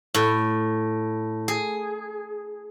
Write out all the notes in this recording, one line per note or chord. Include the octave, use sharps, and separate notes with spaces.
A2
G#4